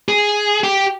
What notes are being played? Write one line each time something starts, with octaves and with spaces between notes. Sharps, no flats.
G#4
G4